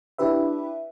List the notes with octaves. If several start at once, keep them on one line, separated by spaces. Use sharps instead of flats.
D4 E4 G4 B4 E5